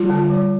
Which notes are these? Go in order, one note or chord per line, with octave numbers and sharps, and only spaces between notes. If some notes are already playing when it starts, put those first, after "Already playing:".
Already playing: G3 F4
D3
G3